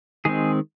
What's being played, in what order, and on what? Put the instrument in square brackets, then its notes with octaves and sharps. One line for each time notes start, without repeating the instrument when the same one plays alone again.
[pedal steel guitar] D#3 G#3 C4 G#4